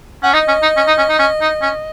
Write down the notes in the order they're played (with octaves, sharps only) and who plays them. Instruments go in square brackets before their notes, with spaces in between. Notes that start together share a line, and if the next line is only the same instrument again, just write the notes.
[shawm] C#4 [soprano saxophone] F#5
[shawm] D#4 [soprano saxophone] D#5
[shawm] C#4
D#4
C#4
D#4
C#4
D#4
C#4
D#4
C#4